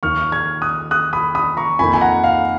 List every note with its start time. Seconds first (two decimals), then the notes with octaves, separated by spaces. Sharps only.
0.03 D#2 D#3 A#3 D#4 C#6 F6
0.32 F6 G#6
0.62 D#6 F#6
0.91 D#6 F#6
1.13 B5 D#6
1.35 B5 D#6
1.57 A#5 C#6
1.79 F2 D#3 A#3 D#4 G#5 B5
1.93 G#5
2.01 F#5 A#5
2.24 F5